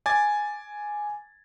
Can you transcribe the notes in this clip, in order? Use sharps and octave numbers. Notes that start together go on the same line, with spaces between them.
G#5 D6 G#6 A6